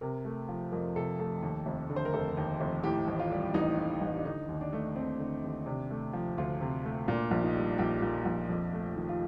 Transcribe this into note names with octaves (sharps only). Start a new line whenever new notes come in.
C3 A#4
A3
F3
F2 A#4
C3 A4
A3 A4
D#2
F1
D3
C5
A#4
F1 A4
D#2
F1
A2 G4
A1
F4
G3
A1 D#4
A2
A1
D4
D3 D#4
D#2
D4
A3
D#2 C4
D3
D#2
C3 D4
A3
F3
D2 F4
C3
A3
A#2 D4
A#1
D#4
G3
A#1 G4
A#2
A#1
F2
A3
D#3
F4